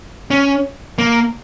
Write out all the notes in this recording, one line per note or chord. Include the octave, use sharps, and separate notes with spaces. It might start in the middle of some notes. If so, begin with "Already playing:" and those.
C#4
A#3